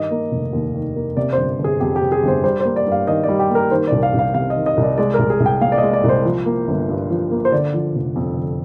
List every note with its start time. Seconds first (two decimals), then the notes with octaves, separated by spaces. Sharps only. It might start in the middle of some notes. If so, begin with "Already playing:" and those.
Already playing: G2 D#3 D#5
0.11 A#3
0.32 F1
0.53 D#2
0.75 D#3
0.96 A#3
1.17 C3 D5
1.33 G1 C5
1.59 G1
1.64 G#4
1.80 F2 G4
1.96 G4
2.02 C3
2.12 G#4
2.23 G1
2.28 C5
2.44 G3 C5
2.60 C5
2.65 A#3
2.76 D5
2.86 G2
2.92 F5
3.07 D#3 D#5
3.23 D5
3.29 G3
3.40 G4
3.50 A#3
3.55 A#4
3.71 D#3 C5
3.87 C2 D5
4.03 F5
4.14 C2
4.19 F5
4.34 C3 F5
4.50 D#5
4.56 D#3
4.66 D#5
4.77 C2
4.83 D5
4.98 G#3 D5
5.14 C2 A#4
5.30 G#4
5.40 C2
5.46 G5
5.61 A#2 F5
5.72 D5
5.78 D#5
5.83 G#3
5.93 D5
6.04 C2
6.09 C5
6.25 F3
6.46 A#3
6.68 G1
6.89 G2
7.10 F3
7.31 A#3
7.45 C5
7.52 D3 D5
7.74 F3
7.95 F1
8.16 F2
8.37 D3